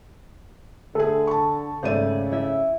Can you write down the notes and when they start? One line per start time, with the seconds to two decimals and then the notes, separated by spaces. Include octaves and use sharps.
0.95 D3 A3 G#4 A4
1.27 A5 C#6
1.83 G#1 C#3 A3 C5 D5 D#7
2.32 E4 E5